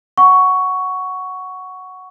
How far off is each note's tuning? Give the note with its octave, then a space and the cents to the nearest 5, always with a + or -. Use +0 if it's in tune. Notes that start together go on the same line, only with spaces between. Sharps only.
F#5 +0 C#6 +10